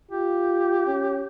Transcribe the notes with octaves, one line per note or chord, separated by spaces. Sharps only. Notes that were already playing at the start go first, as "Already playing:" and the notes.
F4 G4
C#4